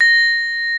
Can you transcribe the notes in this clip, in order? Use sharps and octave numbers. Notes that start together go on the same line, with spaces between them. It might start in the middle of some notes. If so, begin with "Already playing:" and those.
A#6